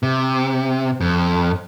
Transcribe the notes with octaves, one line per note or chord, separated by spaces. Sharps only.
C3
F2